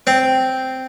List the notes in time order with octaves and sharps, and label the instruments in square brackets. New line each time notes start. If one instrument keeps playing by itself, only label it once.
[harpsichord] C4